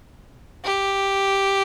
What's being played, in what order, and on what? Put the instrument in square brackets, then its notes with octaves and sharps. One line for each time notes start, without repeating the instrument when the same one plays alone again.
[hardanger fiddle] G4